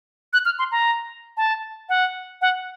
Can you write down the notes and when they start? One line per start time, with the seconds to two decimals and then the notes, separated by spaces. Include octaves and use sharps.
0.33 F#6
0.45 F6
0.59 C6
0.72 A#5
1.37 A5
1.89 F#5
2.42 F#5